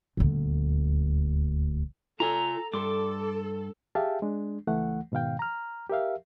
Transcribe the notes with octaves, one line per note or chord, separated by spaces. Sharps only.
D#1 D2
F4 A4 G#5 A#5
G2 A4 C6 D6
G4 G#4 E5 F5 G5 A5
G#3 D4
C#2 E3 A3 F#5
G#2 B2 D#3 F5 G5
A#5 F6
G4 A#4 E5 F5